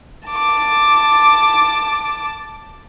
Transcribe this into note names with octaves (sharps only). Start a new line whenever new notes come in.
A5 D6